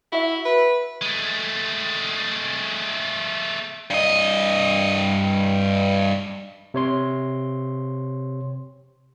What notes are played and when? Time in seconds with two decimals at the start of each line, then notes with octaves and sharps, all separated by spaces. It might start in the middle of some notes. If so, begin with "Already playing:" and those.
0.12 E4 F#4 E5
0.45 B4
1.02 G#3 A3
3.90 G2 D#5
6.74 C3 C#5 C6